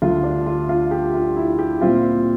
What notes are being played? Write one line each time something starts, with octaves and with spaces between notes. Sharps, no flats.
D2 D3 G3 F4
D4
F4
F4
G4
F4
E4
G4
A#2 G3 C4 F4